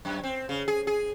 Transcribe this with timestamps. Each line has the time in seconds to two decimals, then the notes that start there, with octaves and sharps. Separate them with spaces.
0.05 F#2
0.24 C4
0.49 C#3
0.68 G#4
0.87 G#4